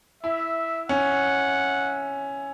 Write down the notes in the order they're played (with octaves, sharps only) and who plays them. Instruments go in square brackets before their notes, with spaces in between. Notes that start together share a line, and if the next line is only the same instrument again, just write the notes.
[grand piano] E4 [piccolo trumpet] E5
[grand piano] C#4 [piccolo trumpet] F#5